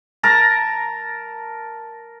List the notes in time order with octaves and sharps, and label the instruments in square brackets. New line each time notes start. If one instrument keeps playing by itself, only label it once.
[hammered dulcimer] A#4 A5 A#5